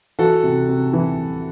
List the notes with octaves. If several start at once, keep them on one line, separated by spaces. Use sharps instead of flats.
E3 F#4 A4
C3
C3
E3